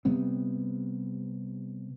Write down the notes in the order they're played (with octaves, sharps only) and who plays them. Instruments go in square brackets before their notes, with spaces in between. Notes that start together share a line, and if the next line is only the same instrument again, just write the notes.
[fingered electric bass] C3 G3 B3 C4